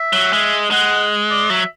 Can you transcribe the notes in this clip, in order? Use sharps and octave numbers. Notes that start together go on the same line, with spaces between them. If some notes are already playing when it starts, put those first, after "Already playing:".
Already playing: E5
F#3
G#3
G#3 F#5
D5
F#3 E5